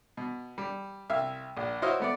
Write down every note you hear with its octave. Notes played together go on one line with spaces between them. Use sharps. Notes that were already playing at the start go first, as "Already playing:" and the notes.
B2
G3
C2 E5 F5
A#1
E4 F#4 C5 C#5 D#5 F5
A3 B3 D5